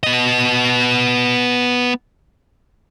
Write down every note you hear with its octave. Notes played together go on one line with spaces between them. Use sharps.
B3 D#5